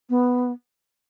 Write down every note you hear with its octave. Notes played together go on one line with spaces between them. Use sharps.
B3